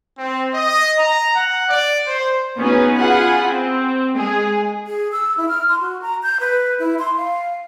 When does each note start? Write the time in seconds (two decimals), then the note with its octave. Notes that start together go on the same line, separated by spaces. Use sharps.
0.17 C4
0.53 D#5
0.97 A#5
1.34 F#5
1.69 D5
2.06 C5
2.60 B3 C#4 D#4 F#4 G#4 B4
2.96 F4 G#4 F#5 G#5 B5
3.45 C4
4.16 G#3 G#4
4.87 G#4
5.12 E6
5.37 E4
5.49 F6
5.69 C6
5.81 F#4
6.02 A#5
6.23 G6
6.40 B4
6.79 E4
6.99 C6
7.17 F5